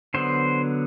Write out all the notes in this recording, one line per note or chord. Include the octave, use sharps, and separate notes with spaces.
D3 F#3 B3 C5